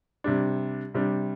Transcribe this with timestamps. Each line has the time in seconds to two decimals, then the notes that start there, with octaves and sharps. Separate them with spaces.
0.24 C3 G3 D4
0.94 C3 G3 D4